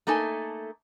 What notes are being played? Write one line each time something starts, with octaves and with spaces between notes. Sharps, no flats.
A3 A#3 D#4 A4 G#5